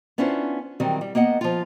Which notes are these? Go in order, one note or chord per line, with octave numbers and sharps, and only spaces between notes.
B3 C#4 D4 E4 F4 C5
D#3 E3 F#3 G3 C4
G3
A#3 B3 D#5 F#5
F3 F4